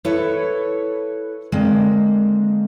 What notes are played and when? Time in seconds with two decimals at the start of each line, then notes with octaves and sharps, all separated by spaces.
0.05 E4 A4 B4 C#5
1.52 D3 G#3 A#3 C4